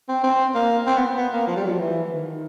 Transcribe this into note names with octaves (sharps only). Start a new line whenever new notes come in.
C4
C4
A#3
C4
B3
B3
A#3
F3
G3
F#3
F3
E3
D#3